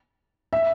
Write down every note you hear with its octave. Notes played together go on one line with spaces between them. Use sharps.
E5